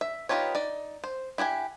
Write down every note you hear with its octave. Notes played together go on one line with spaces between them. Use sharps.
E5
B3 D#4 F4 G4 C#5
D#4 D5
C5
E4 G4 F#5 G#5